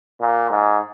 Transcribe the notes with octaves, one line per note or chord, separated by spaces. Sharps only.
A#2
G#2